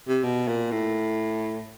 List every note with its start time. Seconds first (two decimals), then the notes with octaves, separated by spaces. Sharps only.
0.08 C3
0.23 B2
0.48 A#2
0.71 A2